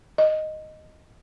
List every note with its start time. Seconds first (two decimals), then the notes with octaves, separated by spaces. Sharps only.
0.18 D#5